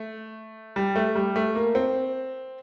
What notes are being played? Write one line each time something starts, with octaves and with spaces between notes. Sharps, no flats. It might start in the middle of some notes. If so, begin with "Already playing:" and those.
Already playing: A3
G3
A3
G3
A3
A#3
C4